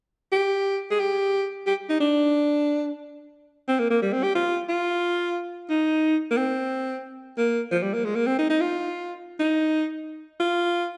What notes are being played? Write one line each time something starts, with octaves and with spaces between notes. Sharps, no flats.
G4
G#4
G4
G4
D#4
D4
C4
A#3
A#3
G3
C4
G4
F4
F4
D#4
A#3
C4
A#3
F3
G3
A#3
G#3
A#3
C4
D#4
D#4
F4
D#4
F4